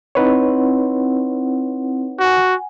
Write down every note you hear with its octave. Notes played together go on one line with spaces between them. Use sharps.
C4 D#4 E4 B4 C#5 F#5
F#4 F#5 G#5